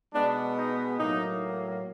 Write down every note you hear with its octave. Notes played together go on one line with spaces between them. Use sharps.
B2 G#3 B3 D4
D#4
A2 F#3 A#3 D#4